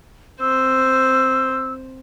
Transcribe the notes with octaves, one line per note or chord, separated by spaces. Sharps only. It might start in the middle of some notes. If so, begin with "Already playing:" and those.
C4 C5 E6